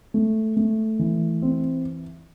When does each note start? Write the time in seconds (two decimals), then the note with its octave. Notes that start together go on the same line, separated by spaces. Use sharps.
0.14 A3
0.57 A3
0.99 E3
1.42 C4